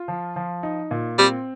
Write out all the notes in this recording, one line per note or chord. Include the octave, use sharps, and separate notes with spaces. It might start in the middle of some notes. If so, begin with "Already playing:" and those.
Already playing: F4
F3
F3
D#4
A#2
G3 C4